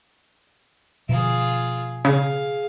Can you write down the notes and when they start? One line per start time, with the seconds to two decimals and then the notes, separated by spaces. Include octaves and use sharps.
1.09 B2 D3 F3 F4 G#4
2.05 C#3 G#4 F5